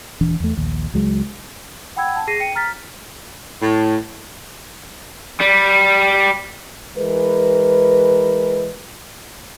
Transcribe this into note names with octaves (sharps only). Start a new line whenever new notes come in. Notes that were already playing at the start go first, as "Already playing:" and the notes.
D#1 E3 D4
E2 A3
A#1 D#2
C#2 F#3 G#3
F#5 G5 B5 E6 G#6
A5
G#4 A#6 C7 D#7
G5 C#7 D#7
A#5 F6 A6 B6
A2
G3
E3 G#3 A#4 B4